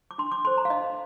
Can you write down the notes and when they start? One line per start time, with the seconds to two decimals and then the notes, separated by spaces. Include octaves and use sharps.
0.11 D6
0.18 D4 C6
0.32 D6
0.45 A4 C5 C6
0.57 A#5
0.65 F5
0.70 D4 D#5